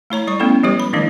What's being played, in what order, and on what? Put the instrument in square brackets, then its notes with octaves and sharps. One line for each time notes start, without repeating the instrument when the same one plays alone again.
[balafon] A3 E4 C#5 A#5
G3 D5 C#6
A3 B3 C#4 E4 A4
F3 G3 G#3 G4 B4 C#5
B5
D#3 F3 G3 A3 D4 E4